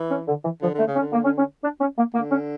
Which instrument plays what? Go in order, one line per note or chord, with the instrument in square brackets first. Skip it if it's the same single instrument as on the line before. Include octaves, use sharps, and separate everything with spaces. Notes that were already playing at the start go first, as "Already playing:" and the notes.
Already playing: [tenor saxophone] E3
[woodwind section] C#4
D3
E3
[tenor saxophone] D3 [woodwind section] F3
[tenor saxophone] D3
[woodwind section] A3
[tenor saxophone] C#3
[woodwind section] C#4
[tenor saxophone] D3
[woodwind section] A#3
C#4
C#4
D4
C#4
A#3
[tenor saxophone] D3 [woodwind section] A#3
[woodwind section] C#4